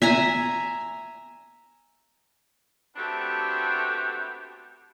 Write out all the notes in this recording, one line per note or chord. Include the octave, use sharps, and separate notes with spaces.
E5 G#5 A#5
A3 B3 C4 D4 F#4 G4